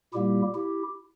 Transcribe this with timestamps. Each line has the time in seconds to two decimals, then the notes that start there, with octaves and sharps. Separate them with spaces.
0.13 A#2 G3 A#3 E4 G4
0.54 E4 G4